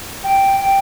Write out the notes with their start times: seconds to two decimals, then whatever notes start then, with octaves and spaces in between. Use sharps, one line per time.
0.24 G5
0.60 G5